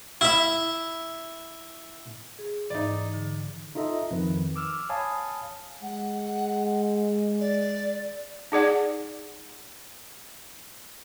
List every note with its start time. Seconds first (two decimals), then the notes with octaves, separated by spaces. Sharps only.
0.21 E4 E5
2.39 G#4
2.70 G#2 E3 D#4 D5
3.14 D3
3.75 D#4 F4 A4 D#5 E5
4.11 F2 D#3 B4
4.56 D6 E6 F6
4.89 C#5 F5 G#5 A5 B5 D#6
5.82 G#3 F#5
7.40 D5
8.52 D#4 G#4 D5 F#5